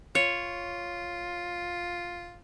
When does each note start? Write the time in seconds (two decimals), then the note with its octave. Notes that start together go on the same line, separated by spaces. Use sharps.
0.15 F4 C#5